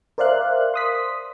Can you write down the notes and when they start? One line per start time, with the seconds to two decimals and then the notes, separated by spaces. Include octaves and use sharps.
0.18 A#4 C5 D5 E5 F5 F#6
0.74 C6 D#6 B6